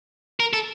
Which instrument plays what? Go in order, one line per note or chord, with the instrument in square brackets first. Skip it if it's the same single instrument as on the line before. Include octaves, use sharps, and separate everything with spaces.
[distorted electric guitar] A#4
A4